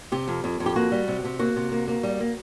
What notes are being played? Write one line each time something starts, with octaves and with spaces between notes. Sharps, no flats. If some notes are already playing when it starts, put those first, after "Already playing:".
C3 G4
F2
F2
F2
G4
A#3 F#4
G3
C3
C3
A#3 F#4
C3
A#3
A#3
G3
A#3